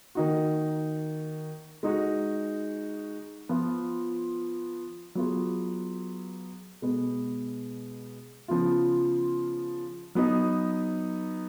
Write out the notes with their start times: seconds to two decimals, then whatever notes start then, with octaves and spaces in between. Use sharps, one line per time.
0.15 D#3 A#3 D#4 F#4
1.83 G#3 D#4 F#4
3.49 F3 B3 F4
5.15 F#3 B3 F4 G#4
6.82 B2 G#3 B3
8.48 C#3 F3 B3 F4
10.15 F#3 B3 D#4